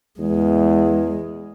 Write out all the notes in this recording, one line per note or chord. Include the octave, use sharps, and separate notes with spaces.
E2 G#3